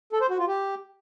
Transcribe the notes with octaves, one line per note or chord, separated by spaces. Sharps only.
A4
C5
F#4
F4
G4